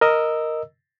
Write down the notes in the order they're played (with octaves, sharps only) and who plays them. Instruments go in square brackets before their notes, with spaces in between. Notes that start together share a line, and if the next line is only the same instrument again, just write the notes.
[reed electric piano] A#4 D#5 E6